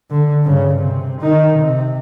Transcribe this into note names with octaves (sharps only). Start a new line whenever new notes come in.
D3
G2 C#3
C3
D#3 D#4
C3